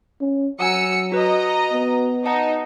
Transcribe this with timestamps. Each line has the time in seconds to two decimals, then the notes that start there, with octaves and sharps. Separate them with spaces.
0.21 C#4
0.60 F#3 F#5 G#5 A#5 E6 C#7
1.12 F#4 B4 D#5 A#5
1.72 B3
2.26 D#4 D#5 F#5 A5